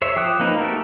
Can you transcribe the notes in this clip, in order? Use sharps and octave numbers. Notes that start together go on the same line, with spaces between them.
C5 C#5 E5
F3 G5 D6 D#6 F#6
A#3 C4 D#4 B4
A3 F#4 G4 A4 A#4